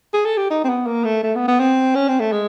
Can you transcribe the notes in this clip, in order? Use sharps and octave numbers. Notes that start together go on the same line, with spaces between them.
G#4
A4
G4
D#4
C4
B3
A#3
A3
A3
B3
B3
C4
C#4
C4
A3
G#3